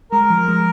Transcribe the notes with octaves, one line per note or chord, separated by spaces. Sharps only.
G#3 A#4
F3
G#3